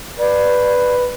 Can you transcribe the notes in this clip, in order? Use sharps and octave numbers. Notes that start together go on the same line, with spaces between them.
B4 D5